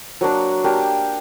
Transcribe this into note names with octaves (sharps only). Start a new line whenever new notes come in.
F#3 A#3 D4
A#3 D4 G4